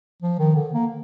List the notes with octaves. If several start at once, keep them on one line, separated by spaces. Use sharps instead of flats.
F3
D#3
D3
A#3